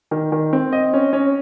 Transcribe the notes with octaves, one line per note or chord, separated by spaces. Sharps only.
D#3
D#3
C4
D#5
C#4
C#4